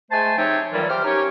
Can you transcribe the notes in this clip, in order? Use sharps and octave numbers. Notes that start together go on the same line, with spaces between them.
G#3 A3 C5 G#5 A5
C3 F3 D#4 C#5 E5 G5
A#2 D#3 E3 F#3 G3
G4 C5 E5 F6
C#4 D#4 G4 C#5